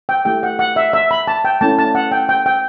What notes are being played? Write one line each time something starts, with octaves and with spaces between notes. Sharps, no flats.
G5
A3 E4 G4 G5
F#5
F#5
E5
E5
B5
A5
G5
A3 C#4 E4 A5
A5
F#5
G5
G5
G5